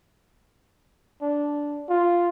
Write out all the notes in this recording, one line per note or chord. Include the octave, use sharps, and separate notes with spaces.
D4
F4